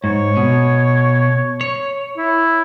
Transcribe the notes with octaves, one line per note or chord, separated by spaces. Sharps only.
G#2 C#5
B2
C#5
E4